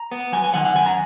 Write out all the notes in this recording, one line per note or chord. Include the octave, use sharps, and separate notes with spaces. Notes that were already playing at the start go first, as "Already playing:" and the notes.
Already playing: A#5
B3
F#3 G#5
G#5
D#3 F#5
F#5
F#2 G#5
A#5